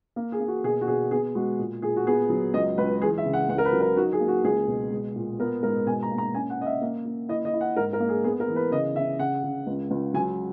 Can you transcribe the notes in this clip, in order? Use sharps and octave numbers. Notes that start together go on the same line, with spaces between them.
A#3
G#4
A#3
F#4
B2 G#4
F#4
B2 G#4
B3 G#4
G#3 F#4
A#2
A#2 G#4
F#4
B3 G#4
F#3
C#2 D#5
C#2 B4
E3 G#4
E5
C#3
F#5
C#2 F#5
A#4
B4
F#3
A#4
D#4 F#4
G#4
A#3
F#4
C#2 G#4
B2
G#3
A#2
B3 A#4
G#2 A#4
B2 G#5
A#5
A#3
A#5
C#4 G#5
F#5
C#4 D#5
E5
A#3
A#3
E4 D#5
D#5
E4
F#5
G#2 A#4
A#4
A#3
G#4
B3 G#4
A#4
E3
B4
C#3 D#5
C#3 E5
C#3 F#5
C#3
C#2
C#2
F#3 G#5